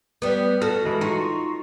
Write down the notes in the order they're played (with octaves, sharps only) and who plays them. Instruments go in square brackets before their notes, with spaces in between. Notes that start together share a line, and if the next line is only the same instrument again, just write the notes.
[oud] G3 B3
[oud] F#4 A4 [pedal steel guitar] F6
[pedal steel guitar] E3 G#3
[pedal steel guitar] D#4 F4 C#6 [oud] F#4